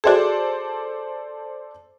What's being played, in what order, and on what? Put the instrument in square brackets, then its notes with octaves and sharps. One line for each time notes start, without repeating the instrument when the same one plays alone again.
[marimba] F#4 G#4 [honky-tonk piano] A4 C5 D5